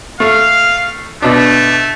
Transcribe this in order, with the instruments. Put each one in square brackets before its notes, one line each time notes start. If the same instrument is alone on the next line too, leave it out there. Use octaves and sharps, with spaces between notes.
[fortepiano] A3 [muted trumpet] F5
[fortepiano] B2 D4 [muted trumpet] A3